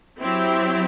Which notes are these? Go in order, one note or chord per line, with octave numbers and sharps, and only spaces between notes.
F#3 C4 E4 G4